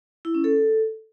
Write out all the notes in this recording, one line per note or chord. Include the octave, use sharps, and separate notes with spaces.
E4
C#4
A4